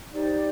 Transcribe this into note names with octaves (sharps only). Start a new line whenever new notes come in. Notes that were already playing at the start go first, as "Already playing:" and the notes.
D#4 G4 C5 D5